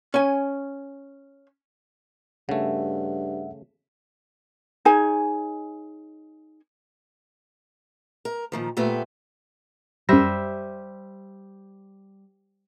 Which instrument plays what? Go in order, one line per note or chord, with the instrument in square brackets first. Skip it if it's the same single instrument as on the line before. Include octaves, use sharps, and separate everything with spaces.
[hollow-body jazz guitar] C#4 G#5
[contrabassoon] G2 [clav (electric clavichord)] C#3 A3 [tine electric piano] E5 F#5
[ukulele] D#4 G#4 C#5 G#5
[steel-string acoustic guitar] A#4
A#2 D#3 F3
A#2 A3 B3 G4 C5
[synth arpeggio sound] F#2 A#6 [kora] G3 C5 E5